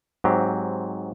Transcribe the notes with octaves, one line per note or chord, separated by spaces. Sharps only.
G#2 F#3 C4 G4